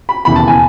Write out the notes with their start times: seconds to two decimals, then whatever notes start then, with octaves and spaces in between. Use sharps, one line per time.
0.09 B5
0.25 E1 D#2 C#3 E3 B3 B5
0.36 A5
0.48 G#5